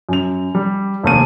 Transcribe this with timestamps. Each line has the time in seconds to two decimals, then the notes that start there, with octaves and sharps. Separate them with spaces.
0.09 F#2 F7
0.55 G3
1.03 F1 D#2 D#7